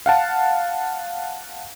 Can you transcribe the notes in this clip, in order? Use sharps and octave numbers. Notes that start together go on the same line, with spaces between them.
F5 F#5 A5